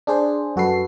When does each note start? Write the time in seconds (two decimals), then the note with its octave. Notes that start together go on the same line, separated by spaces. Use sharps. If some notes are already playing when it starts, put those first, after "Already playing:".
0.07 D4 G#4 C5
0.56 F#2 F#4 A4 B4 C7